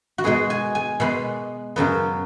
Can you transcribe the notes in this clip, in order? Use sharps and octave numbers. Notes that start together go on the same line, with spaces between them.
F#4
B2 G#3 B3 G#4
G#5
G#5
B2 G#3 B3
F#2 C#3 F#3 B3